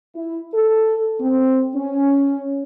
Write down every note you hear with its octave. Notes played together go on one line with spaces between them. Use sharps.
E4
A4
C4
C#4